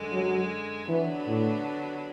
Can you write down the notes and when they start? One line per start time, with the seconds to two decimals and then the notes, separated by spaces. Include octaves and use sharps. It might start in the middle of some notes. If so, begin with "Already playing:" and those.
Already playing: F#2 D3 G#3
0.13 F#3
0.89 D3 E3 F#3 B3 D4
1.27 A2